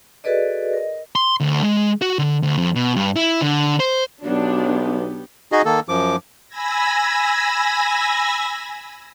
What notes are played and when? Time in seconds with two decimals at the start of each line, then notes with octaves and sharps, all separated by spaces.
0.24 F#4 G#4 A4 B4 D5 D#5
0.73 A#4 D#5
1.16 C6
1.40 D2
1.64 G#3
2.02 F#4
2.19 D3
2.43 D2
2.57 F2
2.75 B2
2.96 G2
3.16 E4
3.41 D3
3.80 C5
4.24 B1 F#3 B3 D4 G4
5.52 D#4 F#4 G#4 D#5
5.65 D#3 A#3 A4
5.89 F#2 F3 D6
6.48 G#5 B5 E6 G#6 A#6